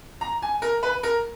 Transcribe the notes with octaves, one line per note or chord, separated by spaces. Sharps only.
A#5
G#5
A#4
B4
A#4